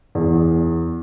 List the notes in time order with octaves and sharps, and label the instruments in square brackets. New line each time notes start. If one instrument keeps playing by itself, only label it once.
[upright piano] E2